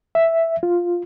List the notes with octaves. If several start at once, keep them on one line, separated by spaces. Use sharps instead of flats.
E5
F4